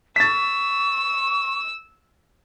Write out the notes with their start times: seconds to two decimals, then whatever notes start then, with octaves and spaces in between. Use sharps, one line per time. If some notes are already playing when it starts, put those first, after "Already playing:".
0.16 C#6 E6 A6 B6